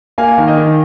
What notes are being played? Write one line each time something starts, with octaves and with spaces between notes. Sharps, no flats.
A#3 F5 G#5
D#3
D#5 G5
D#3